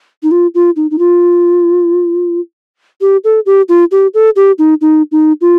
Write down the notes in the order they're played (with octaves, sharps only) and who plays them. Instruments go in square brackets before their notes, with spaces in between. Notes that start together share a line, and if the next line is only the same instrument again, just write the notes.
[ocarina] D#4
F4
F4
D#4
D#4
F4
G4
A4
G4
F4
G4
A4
G4
D#4
D#4
D#4
F4